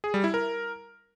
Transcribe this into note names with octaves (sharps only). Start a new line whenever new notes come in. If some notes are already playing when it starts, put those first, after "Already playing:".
G#4
G3
E4
A#4